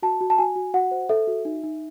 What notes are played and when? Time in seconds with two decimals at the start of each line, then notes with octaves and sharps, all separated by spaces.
0.02 F#4 A5
0.21 F#4
0.30 A5
0.38 F#4 G#5
0.56 F#4
0.74 F#4 F#5
0.91 C5
1.09 A4 E5
1.27 F#4
1.45 D#4
1.63 D#4